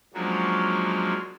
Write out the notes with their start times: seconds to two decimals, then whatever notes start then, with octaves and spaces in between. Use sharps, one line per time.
0.14 F3 F#3 G#3 A#3 C#4 D4